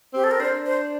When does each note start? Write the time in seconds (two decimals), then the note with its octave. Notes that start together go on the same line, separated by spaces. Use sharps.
0.13 C4 G4
0.24 A4
0.31 A#4
0.40 D4 C5
0.66 C5